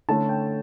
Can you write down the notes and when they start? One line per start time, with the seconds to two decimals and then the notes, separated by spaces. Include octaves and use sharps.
0.09 D3 A3 C#4 A5
0.29 G5